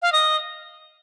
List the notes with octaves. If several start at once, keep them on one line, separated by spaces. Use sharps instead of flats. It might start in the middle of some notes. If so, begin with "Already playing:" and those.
F5
D#5